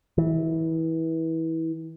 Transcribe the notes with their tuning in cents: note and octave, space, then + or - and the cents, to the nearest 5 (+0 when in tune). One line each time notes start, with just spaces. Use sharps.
E3 -25